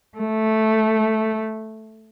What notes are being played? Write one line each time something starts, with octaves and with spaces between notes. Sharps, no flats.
A3